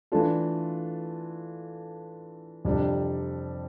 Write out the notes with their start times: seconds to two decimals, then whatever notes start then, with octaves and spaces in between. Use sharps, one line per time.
0.12 E3 A3 D4 F4 A4
2.65 F2 C3 G3 D4